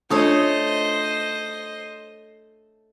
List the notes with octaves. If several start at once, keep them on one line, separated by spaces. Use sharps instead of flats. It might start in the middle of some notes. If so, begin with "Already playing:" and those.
A3 D4 F4 A4 C5 C#5 D#5 D#6